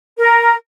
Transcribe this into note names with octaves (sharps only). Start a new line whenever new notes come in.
A#4